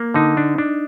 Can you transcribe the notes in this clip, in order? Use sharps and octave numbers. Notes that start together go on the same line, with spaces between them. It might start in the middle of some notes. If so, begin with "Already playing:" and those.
Already playing: A#3
D3 D#4
D4
D4